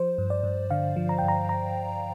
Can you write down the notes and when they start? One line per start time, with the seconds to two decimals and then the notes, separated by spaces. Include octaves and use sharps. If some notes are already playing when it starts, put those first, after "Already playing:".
Already playing: F3 C5
0.18 G2
0.30 D5
0.44 G2
0.70 D3 F5
0.96 F3
1.09 A#5
1.18 G2 G5
1.28 A#5
1.49 A#5